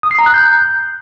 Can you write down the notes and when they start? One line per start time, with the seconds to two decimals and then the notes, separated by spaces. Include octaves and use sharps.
0.03 D#6
0.11 C7
0.19 A#5
0.26 F#6
0.34 G6